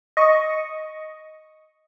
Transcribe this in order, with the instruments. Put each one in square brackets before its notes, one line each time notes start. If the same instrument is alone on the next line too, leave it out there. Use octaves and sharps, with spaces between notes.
[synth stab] D#5 C#6